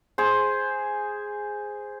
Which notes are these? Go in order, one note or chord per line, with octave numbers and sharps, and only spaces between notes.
G#4 C5